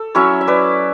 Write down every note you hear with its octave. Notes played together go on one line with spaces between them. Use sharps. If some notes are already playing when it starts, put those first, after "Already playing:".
Already playing: A4
F#3 C#4 E4 C#5 E5
E5
B4 D5